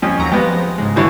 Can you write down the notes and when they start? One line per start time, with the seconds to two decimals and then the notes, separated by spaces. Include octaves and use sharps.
0.02 F2 C#4
0.19 D#2 F#3 A#5
0.32 F3 G#3 B3 G4 A#6
0.78 G#2 C#3 G#3
0.96 D3 E3 C#5